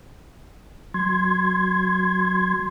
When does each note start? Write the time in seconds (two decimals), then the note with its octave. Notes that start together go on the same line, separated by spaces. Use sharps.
0.94 F#3 C6 G#6